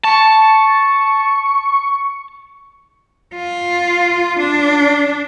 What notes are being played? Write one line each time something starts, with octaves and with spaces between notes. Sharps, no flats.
A5 C#6
F4
D4